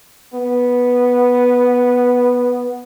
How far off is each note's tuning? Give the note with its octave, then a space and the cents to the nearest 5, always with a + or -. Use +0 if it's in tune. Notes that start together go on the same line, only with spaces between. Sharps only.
B3 -5